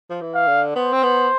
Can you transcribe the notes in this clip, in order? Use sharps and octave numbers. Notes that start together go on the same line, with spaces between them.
F3
E3
F5
D3
B3 C5
C4
B3